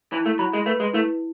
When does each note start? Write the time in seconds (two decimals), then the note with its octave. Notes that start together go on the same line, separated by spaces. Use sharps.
0.12 E3 E4
0.26 A3
0.39 F#3 B5
0.53 G#3
0.66 A3 B4
0.80 G#3
0.93 A3 E4